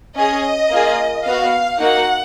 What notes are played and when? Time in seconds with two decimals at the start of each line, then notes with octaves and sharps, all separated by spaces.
0.16 C#4 G#4 D#5
0.71 A#3 F4 G#4
1.25 B3 F#4 F5
1.79 A#3 D#4 F#4 F#5